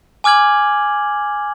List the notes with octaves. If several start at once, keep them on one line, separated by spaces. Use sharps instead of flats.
G#5 D6 F6 G#6 F#7